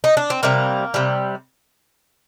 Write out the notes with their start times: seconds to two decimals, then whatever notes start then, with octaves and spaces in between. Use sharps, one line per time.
0.04 D#4
0.17 D4
0.30 C4
0.43 C3 G3 A#3
0.94 C3 G3